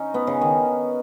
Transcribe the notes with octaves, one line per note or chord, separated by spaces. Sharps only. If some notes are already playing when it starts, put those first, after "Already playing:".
Already playing: C#4 D#4
B3
C#3
D#3